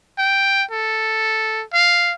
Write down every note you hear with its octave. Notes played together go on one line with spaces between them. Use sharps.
G5
A4
F5